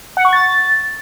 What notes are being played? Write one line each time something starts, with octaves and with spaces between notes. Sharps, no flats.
F#5
C#6
A6